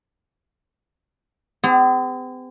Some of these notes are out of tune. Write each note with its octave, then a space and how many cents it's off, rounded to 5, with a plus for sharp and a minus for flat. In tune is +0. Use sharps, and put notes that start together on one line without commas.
C4 -45 G#4 -35